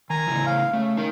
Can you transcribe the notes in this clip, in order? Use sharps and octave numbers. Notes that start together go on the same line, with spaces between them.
D#3 G#5 A#5
A2 C#3 E3
F5
C#3 A3
D#4 A#4